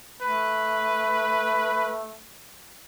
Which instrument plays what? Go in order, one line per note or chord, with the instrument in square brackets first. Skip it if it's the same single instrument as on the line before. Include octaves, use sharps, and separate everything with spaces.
[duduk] A3 [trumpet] B4